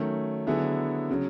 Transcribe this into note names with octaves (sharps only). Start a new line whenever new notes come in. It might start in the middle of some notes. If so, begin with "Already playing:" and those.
Already playing: D#3 F#3 A3 C#4
D3 F#3 B3 E4 G#4
C#3 F#3